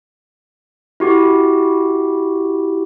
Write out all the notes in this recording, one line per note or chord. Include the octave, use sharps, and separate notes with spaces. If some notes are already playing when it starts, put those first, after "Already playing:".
E4 F#4 G4